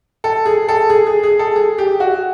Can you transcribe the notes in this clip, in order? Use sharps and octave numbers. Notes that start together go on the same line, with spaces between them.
A4
G#4
A4
G#4
G#4
G#4
A4
G#4
G4
F#4